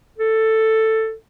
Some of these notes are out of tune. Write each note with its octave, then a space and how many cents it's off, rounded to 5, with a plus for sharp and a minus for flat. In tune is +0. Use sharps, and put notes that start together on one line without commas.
A4 +10